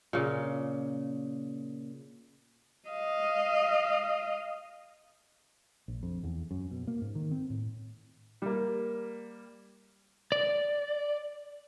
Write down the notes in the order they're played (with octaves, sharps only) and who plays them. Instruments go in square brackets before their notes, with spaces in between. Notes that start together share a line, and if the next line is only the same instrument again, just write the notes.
[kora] A#2 C#3
[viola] D#5 F5
[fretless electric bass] A#1
F2
E2
F#2
B2
A#3
G#2
D#3
C4
A2
[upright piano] G3 A#3
[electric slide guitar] D5